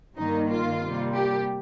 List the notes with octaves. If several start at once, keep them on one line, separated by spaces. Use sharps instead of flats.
G2 D#3 A#3 D#4
F4
C3 G3 A#3
G4